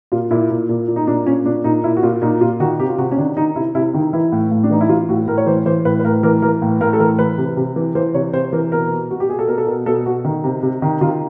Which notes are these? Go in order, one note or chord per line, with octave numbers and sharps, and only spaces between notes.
A#2 F4
A#2 E4
A#2
A#2
A#2
D#4
A#2 D4
A#2 C#4
A#2 D4
A#2 D#4
A#2 E4
F#4
A#2 F4
A#2 D#4
A#2 F4
D#3 F#4
C3 G4
F4
C3 F#4
C#4
D#3 D4
D#3 D#4
C3 E4
C3 E4
D#3 D#4
E3 E4
A2
A2
D4
E3 D#4
E4
E3 F4
A2 F#4
A2 A#4
C#5
E3 C5
E3 C5
A2 B4
B4
A2 A#4
E3 A#4
E3 A#4
A2
A2 A#4
A4
E3 A#4
E3 B4
C3
C3
E3
E3 C5
C3 C#5
C3 C5
E3 A#4
B2 A#4
B2
B2 F#4
G4
B2 G#4
A4
B2 A#4
A4
B2 A#4
B2 A4
B2 F#4
D#3
C3
C3
D#3
D#3 F4